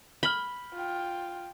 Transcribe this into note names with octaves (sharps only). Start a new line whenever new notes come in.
B5 F6 F#7 G7
F4 G5